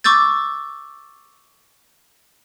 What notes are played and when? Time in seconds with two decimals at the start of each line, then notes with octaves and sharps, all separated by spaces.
0.04 C#6 D6 E6 G6 A6